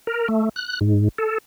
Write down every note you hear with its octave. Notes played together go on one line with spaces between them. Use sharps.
A#4
A3
F#6
G#2
A4